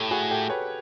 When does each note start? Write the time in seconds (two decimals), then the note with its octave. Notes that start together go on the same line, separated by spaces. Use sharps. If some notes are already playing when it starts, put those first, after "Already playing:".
Already playing: A2 G4 A4
0.11 F#4 G#4
0.30 G4 A4
0.49 B4 C#5